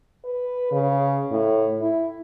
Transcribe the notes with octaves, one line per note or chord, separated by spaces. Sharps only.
B4
C#3
A2
E4